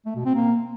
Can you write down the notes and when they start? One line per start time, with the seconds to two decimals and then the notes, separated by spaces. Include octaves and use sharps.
0.06 A3
0.16 B2
0.25 C4
0.35 A#3